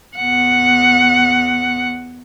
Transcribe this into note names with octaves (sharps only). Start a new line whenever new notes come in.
E2 F#5